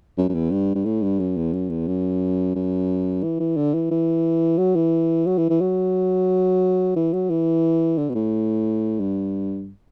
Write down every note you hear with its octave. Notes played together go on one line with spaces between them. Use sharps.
F#2
F#2
E2
G2
G2
A2
G2
F#2
E2
F#2
E2
F#2
F#2
E3
E3
D3
E3
E3
F#3
E3
F#3
E3
E3
F#3
E3
F#3
E3
D3
B2
A2
G2